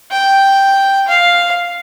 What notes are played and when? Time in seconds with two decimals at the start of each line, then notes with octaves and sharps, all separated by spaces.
0.11 G5
1.08 F5